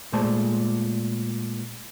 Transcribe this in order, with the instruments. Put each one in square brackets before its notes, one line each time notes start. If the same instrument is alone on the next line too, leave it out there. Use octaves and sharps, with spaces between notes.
[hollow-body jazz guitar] A#2 G#3 A3 C5 A5